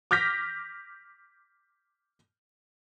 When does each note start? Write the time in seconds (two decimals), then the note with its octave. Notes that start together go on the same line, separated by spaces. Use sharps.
0.11 D6 F6 G6 A#6 B6